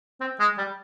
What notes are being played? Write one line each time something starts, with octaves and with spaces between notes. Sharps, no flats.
C4
G#3
G3